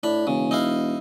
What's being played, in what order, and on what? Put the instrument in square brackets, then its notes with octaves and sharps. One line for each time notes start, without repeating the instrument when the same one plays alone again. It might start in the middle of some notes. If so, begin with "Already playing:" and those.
[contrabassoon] A2 [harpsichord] D4 B5
[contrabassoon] E1 [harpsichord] C#3
[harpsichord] D#4 E4 F5